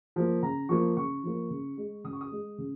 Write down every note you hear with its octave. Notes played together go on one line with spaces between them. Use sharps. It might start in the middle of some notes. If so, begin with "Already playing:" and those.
F3 A#3
C#3 A#5
F3 A#3 C#6
C#3 C#6
F3 A#3
C#3
G#3
C#3 D#6
C#6
D#6
G#3
C#3